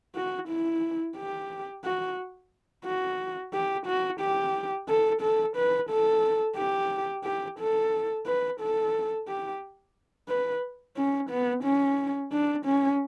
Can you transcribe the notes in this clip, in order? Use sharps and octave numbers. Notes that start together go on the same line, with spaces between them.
F#4
E4
G4
F#4
F#4
G4
F#4
G4
A4
A4
B4
A4
G4
G4
A4
B4
A4
G4
B4
C#4
B3
C#4
D4
C#4